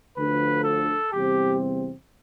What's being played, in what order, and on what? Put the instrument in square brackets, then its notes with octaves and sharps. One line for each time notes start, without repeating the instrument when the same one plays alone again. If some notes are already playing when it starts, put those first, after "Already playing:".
[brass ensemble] D2 D3 F3 B4
A4
E2 C3 G3 C4 G4